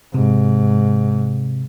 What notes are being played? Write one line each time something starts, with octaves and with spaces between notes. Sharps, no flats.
G#2 C3